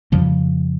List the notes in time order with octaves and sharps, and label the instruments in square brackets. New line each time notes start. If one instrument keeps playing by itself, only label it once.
[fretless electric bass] F2 C#3 F3 G3